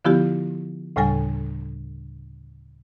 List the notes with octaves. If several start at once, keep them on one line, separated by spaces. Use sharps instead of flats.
D3 F3 B3 E4 F4 G4
D2 A2 C#3 G3 A4 G#5